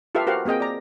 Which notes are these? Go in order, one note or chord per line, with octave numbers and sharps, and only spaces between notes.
F4 G4 A4 B4 E5 F5
F#4 G4 A#4 C5 F5 F#5
A#3 C4 G#4 D#5 G5
D5 A#5